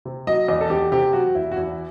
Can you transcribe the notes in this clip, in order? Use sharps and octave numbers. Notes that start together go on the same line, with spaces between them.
C3
F#3 D#5
E2 D#5
A4
E2 G4
C3 G4
F#3 F#4
E2 E4
F#4
E2 E4